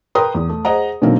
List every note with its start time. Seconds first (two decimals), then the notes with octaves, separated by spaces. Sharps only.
0.15 A#4 B4 G5 A#5 C6 D#6
0.35 E2
0.49 A3
0.65 G#4 C5 D#5 F#5 A#5
1.02 B2 D3 D#3 F#3 A#3 C4